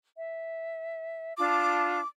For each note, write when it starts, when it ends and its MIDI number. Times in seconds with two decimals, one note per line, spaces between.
0.17 1.33 76
1.37 1.99 62
1.37 1.99 65
1.37 1.99 81
1.37 2.07 86